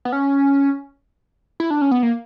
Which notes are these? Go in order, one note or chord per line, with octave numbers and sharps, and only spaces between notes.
B3
C#4
E4
D4
C#4
B3
A#3